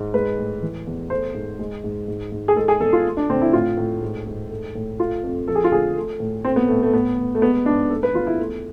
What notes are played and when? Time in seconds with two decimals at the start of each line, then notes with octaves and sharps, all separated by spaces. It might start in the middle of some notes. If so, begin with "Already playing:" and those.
Already playing: G#2
0.14 G#3 B4
0.38 A2
0.62 E3
0.87 E2
1.10 A3 C5
1.34 G#2
1.59 G#3
1.84 G#2
2.08 G#2
2.32 G#2
2.48 G#4
2.56 G#3 A4
2.68 G#4
2.80 E2 A4
2.93 F4
3.05 A3
3.17 D4
3.29 D2 C4
3.42 E4
3.53 A2 F4
3.77 A2
4.01 G#2
4.27 G#2
4.50 A3
4.75 A2
5.00 A3 F4
5.23 F2
5.47 F3 A4
5.55 G#4
5.64 F4
5.71 D2 G#4
5.96 A3
6.20 A2
6.45 A3 C4
6.56 B3
6.68 A2 A3
6.83 A3
6.93 A2 B3
7.18 A2
7.35 A3
7.42 G#3 B3
7.66 G#2 D4
7.90 A3 A4
8.03 B4
8.14 E2 F4
8.27 E4
8.39 A3